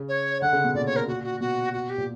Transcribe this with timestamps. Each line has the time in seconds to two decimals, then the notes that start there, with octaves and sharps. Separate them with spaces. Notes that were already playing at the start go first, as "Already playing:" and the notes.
Already playing: C#3
0.09 C#5
0.42 D3 F#5
0.53 C#3
0.64 B2
0.75 A#2 D5
0.86 C#5
0.96 A#4
1.08 F#4
1.24 F#4
1.40 B2 F#4
1.73 F#4
1.90 G4
1.98 A#2